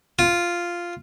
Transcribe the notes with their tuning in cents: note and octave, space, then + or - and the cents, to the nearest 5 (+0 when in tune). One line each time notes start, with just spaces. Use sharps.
F4 -5